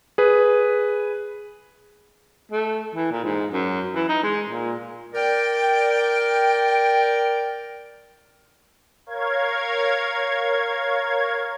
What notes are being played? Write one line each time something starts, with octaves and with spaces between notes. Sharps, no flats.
G#4 B4
A3
E3
A#2
G#2
F#2
E3
D#4
G#3
A#2
A#4 D5 G5
A#4 C#5 F5 G#6